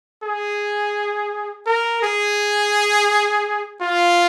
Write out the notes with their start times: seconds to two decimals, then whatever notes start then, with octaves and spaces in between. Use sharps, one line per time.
0.24 G#4
1.67 A#4
2.03 G#4
3.81 F4